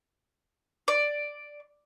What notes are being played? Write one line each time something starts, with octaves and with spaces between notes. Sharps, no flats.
D5